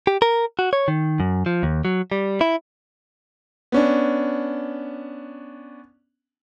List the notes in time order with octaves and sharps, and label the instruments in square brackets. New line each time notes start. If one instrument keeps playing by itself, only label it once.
[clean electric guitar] G4
A#4
F#4
C#5
D#3
F#2
F3
D#2
F#3
G3
E4
[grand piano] B3 C#4 D4